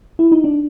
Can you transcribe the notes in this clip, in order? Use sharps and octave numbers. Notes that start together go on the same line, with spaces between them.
E4
D#4
D4